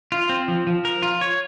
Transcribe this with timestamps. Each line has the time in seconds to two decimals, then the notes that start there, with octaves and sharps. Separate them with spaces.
0.12 F4
0.29 C4
0.48 F3
0.67 F3
0.85 A#4
1.02 F4
1.21 C#5